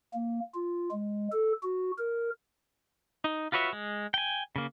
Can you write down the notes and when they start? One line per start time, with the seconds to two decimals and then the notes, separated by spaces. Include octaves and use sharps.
0.14 A#3
0.54 F4
0.91 G#3
1.32 A4
1.62 F#4
1.98 A#4
3.24 D#4
3.52 F4 F#4 B4 C#5 E5
3.73 G#3
4.14 G5 G#5
4.56 C#3 A#3